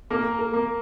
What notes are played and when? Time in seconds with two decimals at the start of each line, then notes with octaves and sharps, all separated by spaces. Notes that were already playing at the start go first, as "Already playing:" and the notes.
0.10 A#3 A#4
0.39 A#4
0.53 A#3